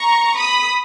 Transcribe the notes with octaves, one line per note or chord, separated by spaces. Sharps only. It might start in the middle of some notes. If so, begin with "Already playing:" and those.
Already playing: A#5 C#6
B5 D#6